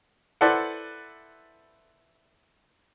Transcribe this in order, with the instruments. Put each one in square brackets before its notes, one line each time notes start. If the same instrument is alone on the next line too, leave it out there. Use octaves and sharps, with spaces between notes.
[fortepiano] E4 A4 B4 C5 D5 F#5